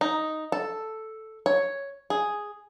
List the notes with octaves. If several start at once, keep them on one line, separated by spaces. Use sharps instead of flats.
D#4
A4
C#5
G#4